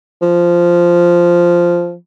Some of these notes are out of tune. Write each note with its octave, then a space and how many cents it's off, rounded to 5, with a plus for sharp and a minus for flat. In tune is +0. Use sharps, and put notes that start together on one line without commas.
F3 -5